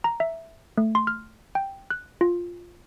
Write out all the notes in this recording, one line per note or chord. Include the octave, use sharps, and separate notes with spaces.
A#5
E5
A3
C6
F6
G5
F#6
F4